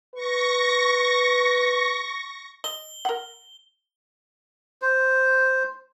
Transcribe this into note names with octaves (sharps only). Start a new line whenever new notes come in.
B4 C#6 A#6
D#5 G7
A#4 F#5
C5